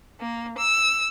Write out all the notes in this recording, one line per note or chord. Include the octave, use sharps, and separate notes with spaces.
A#3
E6